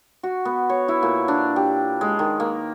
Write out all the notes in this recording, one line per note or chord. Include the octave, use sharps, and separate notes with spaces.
F#4
B3
C#5
E4
A#2
D4
G4
G#3
D#3
A#3